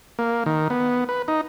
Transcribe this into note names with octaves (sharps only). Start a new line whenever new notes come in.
A#3
D#3
B3
B4
D#4